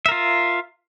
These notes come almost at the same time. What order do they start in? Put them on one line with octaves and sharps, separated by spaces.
E5 A#4 F4